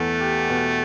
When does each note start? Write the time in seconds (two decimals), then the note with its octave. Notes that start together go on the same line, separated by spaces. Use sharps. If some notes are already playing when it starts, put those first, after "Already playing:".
Already playing: E2 A3
0.20 G4
0.49 B2